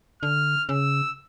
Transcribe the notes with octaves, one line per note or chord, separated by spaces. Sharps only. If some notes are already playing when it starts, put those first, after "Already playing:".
D3 F6
C#3 E6